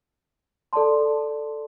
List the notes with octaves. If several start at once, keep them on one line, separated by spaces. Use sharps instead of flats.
A4 D5 A5 C6